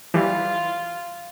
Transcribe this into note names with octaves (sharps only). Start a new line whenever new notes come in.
E3 G3 F4